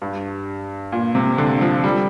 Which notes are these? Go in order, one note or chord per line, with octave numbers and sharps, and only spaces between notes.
G2
A#2
C3
D3
F3
G3